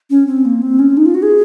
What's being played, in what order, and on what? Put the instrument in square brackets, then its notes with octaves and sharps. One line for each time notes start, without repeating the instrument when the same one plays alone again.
[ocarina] C#4
C4
A#3
C4
C#4
D#4
F4
F#4
G#4